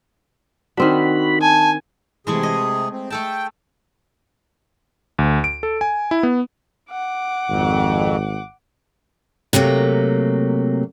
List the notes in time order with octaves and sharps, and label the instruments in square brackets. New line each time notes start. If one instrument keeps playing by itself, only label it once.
[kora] D#3 C4 D4 [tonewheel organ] F#4 B5
[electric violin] G#5 [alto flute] A5
[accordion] C3 G#4 [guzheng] E3 G#3 A3
[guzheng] D#5
[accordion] C4
[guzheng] A3 A4 A5 [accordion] G5
[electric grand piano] D2
D7
A4
G#5
E4
B3
[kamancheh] F#5 D6
[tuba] G#1 [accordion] F2
[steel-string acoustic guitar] C3 F#3 A3 A#3